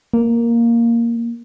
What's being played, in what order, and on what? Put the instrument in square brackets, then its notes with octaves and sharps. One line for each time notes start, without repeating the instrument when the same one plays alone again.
[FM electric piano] A#3